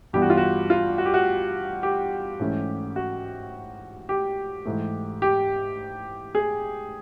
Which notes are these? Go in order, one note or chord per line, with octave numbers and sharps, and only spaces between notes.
G2 E3 G3 B3 G4
F#4
F4
F#4
F4
F#4
G4
F#4
G4
G#2 E3 A3 C#4
F#4
G4
G#2 E3 A3
G4
G#4